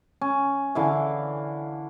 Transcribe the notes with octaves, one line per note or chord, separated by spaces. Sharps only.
C#4
D3 E3 F5